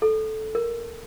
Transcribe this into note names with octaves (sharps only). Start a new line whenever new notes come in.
A4
A#4